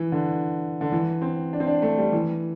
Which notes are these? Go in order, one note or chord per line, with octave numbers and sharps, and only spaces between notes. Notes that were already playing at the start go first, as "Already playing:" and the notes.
Already playing: E3
D3
D3
E3
C4
D4
C4
D4
A3
G3
E3